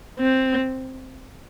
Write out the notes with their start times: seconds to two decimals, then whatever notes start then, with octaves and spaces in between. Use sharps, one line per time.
0.20 C4